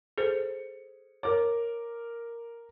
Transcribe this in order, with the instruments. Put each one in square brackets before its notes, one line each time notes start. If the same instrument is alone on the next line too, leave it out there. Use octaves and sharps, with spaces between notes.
[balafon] G#4 A4 C5 [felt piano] C#7
[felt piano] A#4 D6 [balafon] C#5